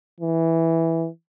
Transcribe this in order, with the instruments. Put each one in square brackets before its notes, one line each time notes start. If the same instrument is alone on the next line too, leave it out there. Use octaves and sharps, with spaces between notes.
[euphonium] E3